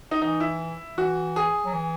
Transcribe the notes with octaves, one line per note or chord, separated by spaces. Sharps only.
D#4
E3 D#4
E4
E3 F#4
G#4
F#3
E3